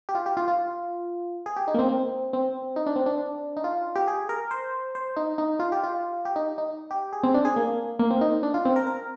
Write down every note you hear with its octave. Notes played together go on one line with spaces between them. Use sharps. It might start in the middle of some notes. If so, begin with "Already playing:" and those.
G4
F4
G4
F4
F4
G#4
G4
D#4
A#3
C4
C4
C4
D#4
D4
C4
D4
D#4
F4
G4
G#4
A#4
C5
C5
D#4
D#4
F4
G4
F4
G4
D#4
D#4
G4
G#4
C4
D4
G#4
A#3
A#3
C4
D#4
D4
F4
C4
A#4
A#4